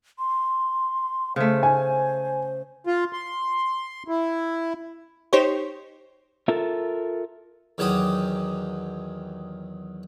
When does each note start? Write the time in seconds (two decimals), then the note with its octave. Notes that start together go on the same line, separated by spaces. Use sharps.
0.19 C6
1.36 C#3 A3 C5
1.63 G#5
2.87 F4
3.13 C6
4.08 E4
5.33 D#4 G4 C5 C#5
6.48 F4 A4 A#4 E5
7.78 E2 D#3 F#3 G4 D6 D#6